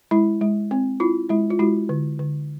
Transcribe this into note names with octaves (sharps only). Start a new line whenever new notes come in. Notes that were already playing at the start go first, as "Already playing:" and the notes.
G#3 E4
G#3
C4
E4 F4
G#3 E4
F4
G#3 E4 F#4
D3
D3